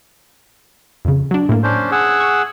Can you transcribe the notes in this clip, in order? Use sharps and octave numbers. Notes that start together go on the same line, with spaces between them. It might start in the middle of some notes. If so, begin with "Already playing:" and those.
F2 C#3
F#3 D4
A2 A#3
C#4 D4 C5
G#4 F#5 E6
C#6